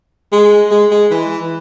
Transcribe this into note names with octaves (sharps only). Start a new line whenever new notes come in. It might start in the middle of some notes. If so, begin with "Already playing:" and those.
G#3
G#3
G#3
E3